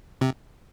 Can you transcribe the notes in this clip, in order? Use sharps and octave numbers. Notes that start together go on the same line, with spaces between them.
C3